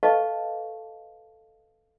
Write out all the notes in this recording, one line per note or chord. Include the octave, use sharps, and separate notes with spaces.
A4 B4 D#5 F5 A5 C#6